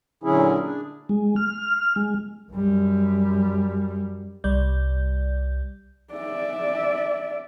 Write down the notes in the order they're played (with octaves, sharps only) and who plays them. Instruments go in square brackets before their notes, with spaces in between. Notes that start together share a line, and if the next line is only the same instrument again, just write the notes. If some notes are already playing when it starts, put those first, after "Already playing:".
[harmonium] A#2 D3 F#3 C#4 E4 G#4
D4 G#4
[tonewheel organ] G#3
F6
G#3
[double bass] F#2 G3
[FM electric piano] C2 G3 D5 G6
[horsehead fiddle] D5 E5